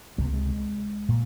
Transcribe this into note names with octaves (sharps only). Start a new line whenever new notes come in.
C#2 C3 G#3 A#3
G#3
A#2